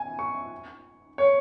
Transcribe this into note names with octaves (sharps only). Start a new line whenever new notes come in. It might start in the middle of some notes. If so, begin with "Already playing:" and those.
Already playing: G#5
C#6
C#5